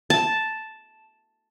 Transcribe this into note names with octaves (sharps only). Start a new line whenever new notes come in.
A5